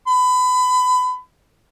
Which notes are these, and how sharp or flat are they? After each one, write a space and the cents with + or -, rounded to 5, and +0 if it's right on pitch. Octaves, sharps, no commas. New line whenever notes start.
B5 +30